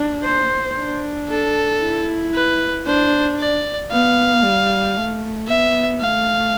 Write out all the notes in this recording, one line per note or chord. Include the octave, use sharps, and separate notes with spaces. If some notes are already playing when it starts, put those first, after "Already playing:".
Already playing: D4
C5
D4
A4
E4
B4
D4 C5
D5
B3 F5
G3
A3
B3 E5
A3 F5